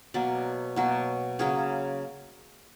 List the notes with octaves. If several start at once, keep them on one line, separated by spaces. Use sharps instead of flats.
B2 F#3 A#3 D5
B2 F#3 A#3
C#3 F#3 A#3 G#4